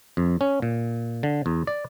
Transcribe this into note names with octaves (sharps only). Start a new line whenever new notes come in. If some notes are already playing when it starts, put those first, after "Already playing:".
F2
C#4
A#2
D3
E2
D5